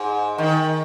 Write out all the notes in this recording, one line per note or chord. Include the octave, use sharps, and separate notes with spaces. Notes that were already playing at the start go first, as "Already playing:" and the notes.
Already playing: G#2
D#3